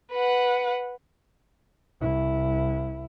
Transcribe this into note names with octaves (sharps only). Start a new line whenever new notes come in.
B4 F#5
C2 E4